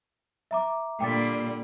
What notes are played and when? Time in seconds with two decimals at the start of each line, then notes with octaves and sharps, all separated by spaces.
0.51 E5 A#5 D6
1.00 A#2 D3 G3 G5 D6 A6